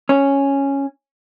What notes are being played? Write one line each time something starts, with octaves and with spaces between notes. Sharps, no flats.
C#4